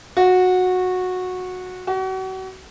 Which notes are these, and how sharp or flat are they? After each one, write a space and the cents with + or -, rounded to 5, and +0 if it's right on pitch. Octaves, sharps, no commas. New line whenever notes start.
F#4 -15
F#4 +35